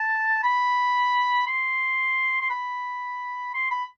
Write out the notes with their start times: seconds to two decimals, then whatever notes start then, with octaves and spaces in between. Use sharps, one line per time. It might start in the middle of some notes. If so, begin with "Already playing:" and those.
Already playing: A5
0.43 B5
1.48 C6
2.41 C6
2.50 B5
3.54 C6
3.71 B5